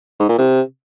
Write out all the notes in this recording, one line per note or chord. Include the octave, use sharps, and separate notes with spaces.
G#2
A#2
C3